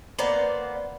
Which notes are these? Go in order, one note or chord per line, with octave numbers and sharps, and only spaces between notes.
A#3 B3 C5 D5